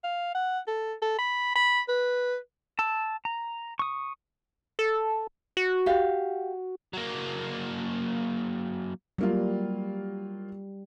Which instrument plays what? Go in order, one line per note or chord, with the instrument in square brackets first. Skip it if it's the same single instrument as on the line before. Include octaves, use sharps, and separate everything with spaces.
[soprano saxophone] F5
F#5
A4
A4
B5
B5
B4
[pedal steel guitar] A5 E6
A#5
C#6 D#6
[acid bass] A4
F#4
[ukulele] G4 F5
[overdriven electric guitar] F#3 A#3
[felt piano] F#3 A#3 F4 [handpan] G3